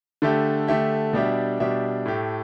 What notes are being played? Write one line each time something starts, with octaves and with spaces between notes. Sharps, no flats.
D3 A3 G4 E5
D3 A3 G4 E5
B2 G3 D4 G4 E5
B2 G3 D4 G4 E5
A2 A3 G4